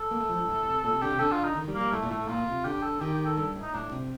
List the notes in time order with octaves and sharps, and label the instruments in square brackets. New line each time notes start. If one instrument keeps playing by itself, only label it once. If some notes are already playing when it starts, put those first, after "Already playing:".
Already playing: [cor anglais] A4
[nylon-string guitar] A#3
A3
F3
G2
A2
C3
[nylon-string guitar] A#2 [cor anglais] A4
[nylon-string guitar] C3
[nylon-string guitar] D3 [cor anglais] G4
[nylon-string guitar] C3
[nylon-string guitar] D3 [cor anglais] A4
[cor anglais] F4
D#4
[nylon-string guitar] D#3
G3
[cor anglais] A#3
[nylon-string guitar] G3
[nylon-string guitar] A2 [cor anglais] A3
[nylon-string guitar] A#2
[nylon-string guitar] A2 [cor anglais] A3
[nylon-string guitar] A#2 [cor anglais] F4
[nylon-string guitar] C3
[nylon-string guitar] D3 [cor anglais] G4
[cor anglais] A4
[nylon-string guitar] D#3 [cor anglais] G4
[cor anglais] G4
A4
[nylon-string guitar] G2 [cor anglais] A4
[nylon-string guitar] A2
[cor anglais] D#4
[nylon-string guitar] A2 [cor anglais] D4
[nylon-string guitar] C3